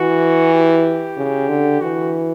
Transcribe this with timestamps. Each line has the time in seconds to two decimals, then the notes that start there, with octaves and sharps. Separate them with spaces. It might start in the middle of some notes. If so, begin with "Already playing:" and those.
Already playing: E3 F#4
0.53 G4
1.17 C#3
1.49 D3
1.81 E3 F#4